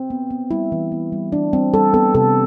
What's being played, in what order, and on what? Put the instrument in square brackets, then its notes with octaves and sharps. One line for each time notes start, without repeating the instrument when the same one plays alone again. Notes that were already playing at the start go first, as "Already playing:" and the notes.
Already playing: [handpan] C4
B3
B3
G3 E4
E3
B3
G3
E3 D4
G3 C4
G3 A4
B3 A4
C3 A4